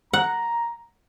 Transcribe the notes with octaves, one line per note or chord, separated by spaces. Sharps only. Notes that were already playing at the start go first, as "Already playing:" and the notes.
F#5 A#5